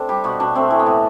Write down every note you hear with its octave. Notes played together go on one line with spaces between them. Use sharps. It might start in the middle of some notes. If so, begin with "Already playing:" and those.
Already playing: A3 C4 D4
G3 G4
B2 F#4
B2 D4
A3 C4
E3
B3
A2